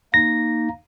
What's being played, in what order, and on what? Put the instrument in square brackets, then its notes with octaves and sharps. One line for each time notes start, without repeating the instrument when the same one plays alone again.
[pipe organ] A#3 D#4 [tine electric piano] A#6